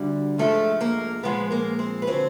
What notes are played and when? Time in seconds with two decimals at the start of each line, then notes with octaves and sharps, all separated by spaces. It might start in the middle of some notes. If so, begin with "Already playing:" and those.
Already playing: D2 D3 G3
0.38 G#2 F3 G#3 A3 A4
0.81 A#3 A#4
1.23 A#2 F3 G#3 B3 B4
1.51 A#3 A#4
1.79 C4 C5
2.02 B4
2.07 D3 F#3 C4 C5